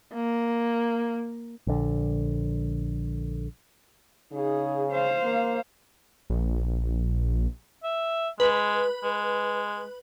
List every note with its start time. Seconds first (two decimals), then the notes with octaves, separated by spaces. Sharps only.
0.14 A#3
1.67 A#1 D3
4.32 C#3 D#4 G#4
4.91 C5 F5
5.23 A#3
6.30 A#1
7.84 E5
8.40 G#3 B4
9.03 G#3